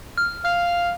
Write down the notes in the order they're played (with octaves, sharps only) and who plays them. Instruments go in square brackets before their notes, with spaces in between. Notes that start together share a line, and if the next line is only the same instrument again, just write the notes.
[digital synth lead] F6
[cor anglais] F5 [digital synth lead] F6